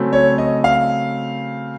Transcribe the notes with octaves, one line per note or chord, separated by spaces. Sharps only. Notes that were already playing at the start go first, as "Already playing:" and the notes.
Already playing: C#3 F#3 A3 C4
C#5
D#5
F5